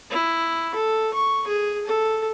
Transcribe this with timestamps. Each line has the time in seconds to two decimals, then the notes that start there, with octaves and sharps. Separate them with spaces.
0.11 E4
0.75 A4
1.14 C#6
1.47 G#4
1.87 A4